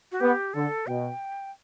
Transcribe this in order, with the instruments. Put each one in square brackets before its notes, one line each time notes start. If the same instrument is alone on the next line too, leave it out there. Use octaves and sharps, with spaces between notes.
[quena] F#4
[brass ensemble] B3 [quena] G4
[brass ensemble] D3 [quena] A4
[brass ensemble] B2 [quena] G5